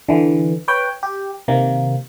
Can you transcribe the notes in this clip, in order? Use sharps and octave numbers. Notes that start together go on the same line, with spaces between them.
D3 E3
B4 C#5 G5
G4
C3 D#3 A#3